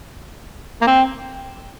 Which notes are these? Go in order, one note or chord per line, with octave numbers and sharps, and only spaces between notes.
A#3
C4